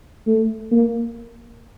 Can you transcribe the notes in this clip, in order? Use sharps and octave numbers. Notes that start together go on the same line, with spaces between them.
A3
A#3